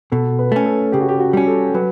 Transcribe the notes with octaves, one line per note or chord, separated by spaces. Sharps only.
B2 A4
B4
A3 C#4
A4
C#3 G4
F#4
G4
F#4
G3 C#4
A4
F#3 B4